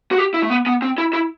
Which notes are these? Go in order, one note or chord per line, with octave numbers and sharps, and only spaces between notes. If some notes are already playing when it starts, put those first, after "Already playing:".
F#4
G4
E4
A3
B3
B3
C4
E4
E4